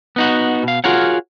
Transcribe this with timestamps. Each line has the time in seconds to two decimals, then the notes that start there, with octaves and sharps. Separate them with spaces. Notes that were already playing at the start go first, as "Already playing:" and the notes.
0.16 B3 D#4 F#4
0.63 B2 F5
0.84 F4 F#4 G#4 A#4 C#5 F#5